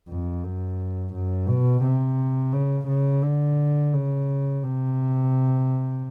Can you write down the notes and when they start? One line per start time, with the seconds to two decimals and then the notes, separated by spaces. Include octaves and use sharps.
0.09 F2
0.44 F#2
1.14 F#2
1.48 B2
1.83 C3
2.53 C#3
2.88 C#3
3.23 D3
3.93 C#3
4.63 C3